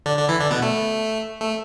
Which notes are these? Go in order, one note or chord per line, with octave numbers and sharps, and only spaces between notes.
D3 D4
D3 D4
E3 E4
D3 D4
B2 B3
A3
A3